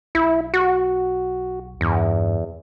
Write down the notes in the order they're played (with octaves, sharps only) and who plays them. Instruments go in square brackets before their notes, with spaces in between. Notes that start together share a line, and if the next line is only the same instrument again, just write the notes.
[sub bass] B1 [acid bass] E4
[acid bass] F#4
[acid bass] E2 [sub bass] G2